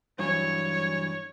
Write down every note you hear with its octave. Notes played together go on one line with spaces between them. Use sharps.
G2 E3 F#3 C#5